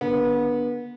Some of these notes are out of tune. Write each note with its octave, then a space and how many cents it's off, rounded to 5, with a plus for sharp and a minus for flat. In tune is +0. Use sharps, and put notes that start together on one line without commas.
D3 +0 B3 -30